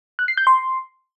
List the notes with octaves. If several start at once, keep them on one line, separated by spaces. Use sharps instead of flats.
F#6
C7
G6
C6